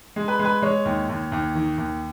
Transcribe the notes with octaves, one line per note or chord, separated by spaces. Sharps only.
G#3
B4
G#3
B4
G#3 C#5
D#2
D#2
D#2
D#3
D#2